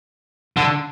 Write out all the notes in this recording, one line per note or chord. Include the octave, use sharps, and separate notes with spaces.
D3